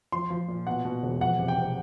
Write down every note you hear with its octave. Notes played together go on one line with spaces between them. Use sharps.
F3 C6
F3
A#2
B2 F#5
B2
E1
F2 F#5
C3
G5
C3